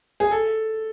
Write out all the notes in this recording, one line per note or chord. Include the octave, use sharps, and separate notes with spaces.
G#4
A4